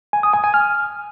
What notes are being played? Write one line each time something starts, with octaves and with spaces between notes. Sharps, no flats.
G#5
D#6
G#5
G#5
F6